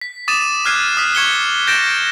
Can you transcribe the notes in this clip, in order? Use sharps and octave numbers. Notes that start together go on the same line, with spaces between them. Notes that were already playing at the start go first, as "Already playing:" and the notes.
B6
D6 D#6 A6 D#7 E7
D6 F6 F#6 G#6 C7 D#7
D#6 B6
C#6 G#6 C#7 E7 G7
G6 A6 A#6 D7 E7